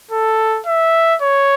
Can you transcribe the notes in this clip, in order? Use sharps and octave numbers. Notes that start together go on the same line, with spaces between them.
A4
E5
C#5